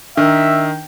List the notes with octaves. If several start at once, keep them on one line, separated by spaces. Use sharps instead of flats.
D#3 D4 E5